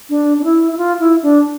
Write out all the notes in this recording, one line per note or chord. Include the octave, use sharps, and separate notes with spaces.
D4
D4
E4
E4
F4
E4
D4